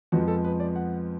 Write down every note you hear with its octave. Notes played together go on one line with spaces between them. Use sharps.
F2 F3 G#3 B3 F#4
A4
B4
D5
F#5